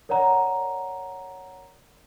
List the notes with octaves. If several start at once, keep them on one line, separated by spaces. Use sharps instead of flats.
A#4 C#5 D5 F#5 A#5